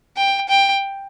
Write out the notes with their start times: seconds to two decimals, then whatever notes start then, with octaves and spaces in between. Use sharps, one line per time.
0.16 G5
0.49 G5